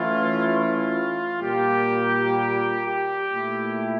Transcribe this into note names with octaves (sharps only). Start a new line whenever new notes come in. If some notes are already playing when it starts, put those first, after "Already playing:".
Already playing: E3 A3 C#4 E4 F4
F4
A#2 G3 A#3 G4
G4
G4
A#2 A3 E4